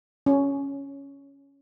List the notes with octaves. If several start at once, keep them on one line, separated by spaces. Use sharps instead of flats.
C#4